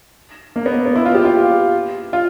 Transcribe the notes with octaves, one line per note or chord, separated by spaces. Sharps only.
A#3
B3
B3
E4
F4
G4
F4
F4